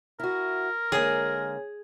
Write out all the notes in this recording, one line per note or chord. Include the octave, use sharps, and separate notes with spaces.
E4 F#4 A#4
D3 G#3 A#3 G#4 C#5 G#5